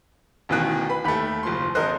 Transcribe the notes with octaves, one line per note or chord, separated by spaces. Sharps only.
A1 D2 B2 D#3 E3 F#6
B4 B5
D#2 A3 G4 B5
F#1 F3 C6
G#1 A#4 C5 D#5 F#6